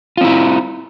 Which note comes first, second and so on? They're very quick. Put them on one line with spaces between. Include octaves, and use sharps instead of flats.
F4 C4 E4